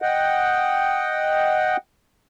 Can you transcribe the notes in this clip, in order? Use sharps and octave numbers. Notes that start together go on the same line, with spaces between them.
D#5 F#5 G5